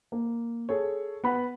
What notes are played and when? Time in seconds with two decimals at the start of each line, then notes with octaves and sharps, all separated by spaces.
0.12 A#3
0.69 G#4 A4 C#5
1.24 B3 F#5 B5